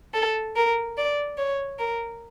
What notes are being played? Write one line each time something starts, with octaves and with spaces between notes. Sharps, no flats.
A4
A#4
D5
C#5
A#4